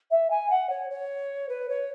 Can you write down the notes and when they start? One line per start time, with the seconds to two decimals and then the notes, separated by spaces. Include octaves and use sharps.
0.10 E5
0.30 G#5
0.50 F#5
0.69 C#5
0.90 C#5
1.49 B4
1.69 C#5